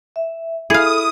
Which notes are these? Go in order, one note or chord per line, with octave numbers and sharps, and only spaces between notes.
E5
E4 G#4 A4 F5 D#6 F6